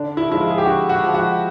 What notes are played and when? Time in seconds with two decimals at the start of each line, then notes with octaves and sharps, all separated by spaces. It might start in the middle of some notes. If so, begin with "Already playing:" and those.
Already playing: D3 D4
0.17 E4
0.29 F3 G#3 E4
0.41 F4
0.50 G#4
0.58 G4
0.66 D3 F#4
0.89 F#4
1.02 F3 G#3
1.14 F#4